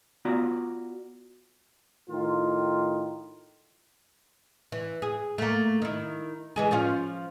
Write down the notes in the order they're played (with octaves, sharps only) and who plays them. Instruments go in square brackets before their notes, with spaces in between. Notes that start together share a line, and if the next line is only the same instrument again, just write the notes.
[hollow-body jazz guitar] B3 F4 F#4 D5 A#5
[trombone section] A2 D#3 F4
[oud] E3
G#4
A3 A#3
D#3 E4
E3 G#3 G#4
F3 C#4 F4